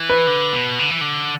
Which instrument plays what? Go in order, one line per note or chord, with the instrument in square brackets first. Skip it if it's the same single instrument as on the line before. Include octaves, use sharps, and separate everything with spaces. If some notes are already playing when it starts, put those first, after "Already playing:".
Already playing: [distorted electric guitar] E3
[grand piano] B4
[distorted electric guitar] D3
B2
D3
E3
D3